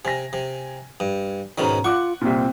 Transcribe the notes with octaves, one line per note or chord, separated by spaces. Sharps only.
C3 G#5 A#6
C3
G2
G#2 B2 D#3 C#4 A#5
F4 F#5 C#6 D6 F#6
C2 A#2 C4